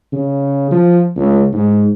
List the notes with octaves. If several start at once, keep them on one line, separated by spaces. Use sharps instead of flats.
C#3
F3
C#2
G#2